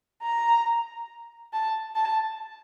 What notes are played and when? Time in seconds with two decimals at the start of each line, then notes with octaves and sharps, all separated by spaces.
0.23 A#5
1.53 A5
1.96 A5